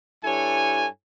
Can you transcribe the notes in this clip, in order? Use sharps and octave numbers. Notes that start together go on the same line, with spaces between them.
G2 E4 A4 C#5 G#5